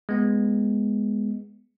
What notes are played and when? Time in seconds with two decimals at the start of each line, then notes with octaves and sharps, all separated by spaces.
0.09 G#3 B3